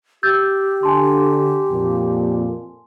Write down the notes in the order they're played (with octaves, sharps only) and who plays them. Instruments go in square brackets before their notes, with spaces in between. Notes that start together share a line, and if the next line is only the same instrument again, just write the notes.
[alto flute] G4 [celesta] E6 G6 A6
[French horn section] D3 [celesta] G#5 A5 C6
[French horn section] F2 A#2